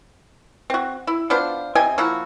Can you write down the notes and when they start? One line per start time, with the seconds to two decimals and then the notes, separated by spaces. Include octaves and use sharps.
0.70 C4 F#4
1.07 E4
1.30 B3 D4 F4 C5
1.75 C3 D#5 G5 G#5
1.98 F3 A#3 E4 F#4